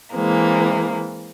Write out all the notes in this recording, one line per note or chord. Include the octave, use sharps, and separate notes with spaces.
E3 G#3 A#3 C4